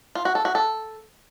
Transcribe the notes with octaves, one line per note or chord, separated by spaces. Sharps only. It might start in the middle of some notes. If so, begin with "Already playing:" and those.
F4
F#4
A4
F#4
A4